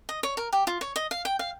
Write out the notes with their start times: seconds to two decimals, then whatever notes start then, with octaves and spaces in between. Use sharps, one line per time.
0.09 D#5
0.23 C#5
0.37 A#4
0.52 G4
0.67 F4
0.81 C#5
0.96 D#5
1.11 F5
1.25 G5
1.39 F5